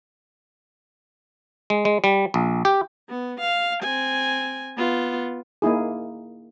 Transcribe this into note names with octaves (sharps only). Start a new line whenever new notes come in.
G#3
G#3
G3
A#1
G4
B3
F5
C4 G#5
B3 F4
A#3 D#4 E4 G#4